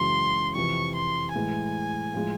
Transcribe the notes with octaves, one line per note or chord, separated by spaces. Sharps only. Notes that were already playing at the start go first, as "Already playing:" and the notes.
Already playing: F#2 C#3 E3 G#3 C6
F2 C3 E3 C#6
C6
A2 E3 G#3 G#5
A2 F3 G#3